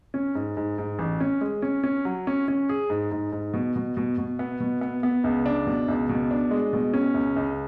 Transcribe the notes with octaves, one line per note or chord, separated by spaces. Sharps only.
C#4
G#2
G#2
G#2
A1
C#4
G#3
C#4
C#4
F#3
C#4
C#4
G#4
G#2
G#2
G#2
B2
B2
B2
B2
B3
B2
B3
B3
C#2
D4
B2
C#2
B2
D4
G#3
B2
C#4
C#2
C#2